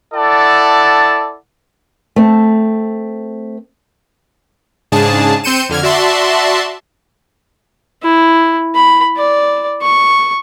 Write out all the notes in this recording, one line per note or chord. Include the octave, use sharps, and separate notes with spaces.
E4 A4 D5 F#5 A5
A3 C4
G#2 C#3 D4 G#4 A5
C4 C6 G6 C#7 D#7 E7
F2 D3 F6 G#6
F#4 D5 E5 A5 C6
E4
B5
D5
C#6